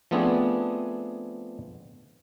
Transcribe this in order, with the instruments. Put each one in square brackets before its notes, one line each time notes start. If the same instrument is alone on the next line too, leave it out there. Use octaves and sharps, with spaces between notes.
[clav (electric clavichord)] F3 A3 B3 C4 D4 G#4